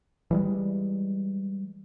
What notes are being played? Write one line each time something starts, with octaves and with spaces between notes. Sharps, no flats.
E3 G3 G#3